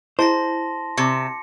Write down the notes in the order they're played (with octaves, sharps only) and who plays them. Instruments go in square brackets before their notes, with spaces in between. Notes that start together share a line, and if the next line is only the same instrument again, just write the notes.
[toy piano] E4 G#4 D#5 [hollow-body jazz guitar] C5 [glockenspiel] A5 C6 A#6
[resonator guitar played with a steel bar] C3 [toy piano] C#6 [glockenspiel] C#7